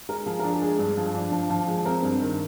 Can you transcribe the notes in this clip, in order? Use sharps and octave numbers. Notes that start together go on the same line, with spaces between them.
G#3 A#4
F3 G#4
D4 A#4
G#4
G#3
G2
F3
D4
F3
F3
G#3
C4 A#4
G2
D#3